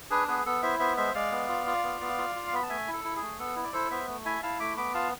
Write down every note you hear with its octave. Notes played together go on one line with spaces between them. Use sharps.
D4 G#4 B4
B3 G#4 B4
B3 A4
E4 C5 E5
B3 C5 E5
G#3 C5 E5
G#3 D5 F5
B3
F4
F4
B3
B3
F4
F4
C6
B3 B5
A5
A3 E5 G#5
E4
A4
E4
G#4
A3
B3 A4
E4
D5
E4 A4 C5
B3 C5 E5
A3
E4 E5 G#5
E4 F5 A5
A3 B5 D6
B3 B5 D6
F4 F5 A5